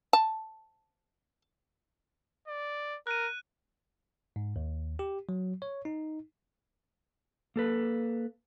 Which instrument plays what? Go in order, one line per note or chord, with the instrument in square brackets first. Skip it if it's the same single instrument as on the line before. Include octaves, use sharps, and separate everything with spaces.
[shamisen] A5
[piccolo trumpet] D5
[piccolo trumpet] A#4 [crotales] F#6 D#7
[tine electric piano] G#2
D#2
G4
F#3
C#5
D#4
[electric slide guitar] A#3 A4 B4